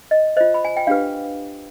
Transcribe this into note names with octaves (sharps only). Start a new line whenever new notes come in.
D#5
F4 C5 D#5
B5
G#5
G5
D4 G4 B4 F5